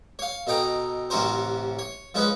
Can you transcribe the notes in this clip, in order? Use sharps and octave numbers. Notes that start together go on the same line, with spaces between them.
C#5 F5
B2 A4 D#5 G5 A#5
A1 C3 C#4 F#4 A#4 C5
C#5
F3 G#3 C#4 G#4 B4